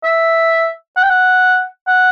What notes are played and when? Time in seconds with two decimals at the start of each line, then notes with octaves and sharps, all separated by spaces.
0.04 E5
0.96 F#5
1.03 G5
1.09 F#5
1.87 F#5